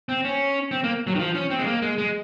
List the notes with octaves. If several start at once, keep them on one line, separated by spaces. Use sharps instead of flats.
C4
C#4
C4
A#3
F#3
D#3
F3
C#4
C4
G#3
A#3
G#3
G#3